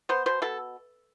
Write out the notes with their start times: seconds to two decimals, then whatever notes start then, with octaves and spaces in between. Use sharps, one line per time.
0.09 B3 C5
0.26 B2 C5
0.42 B2 A4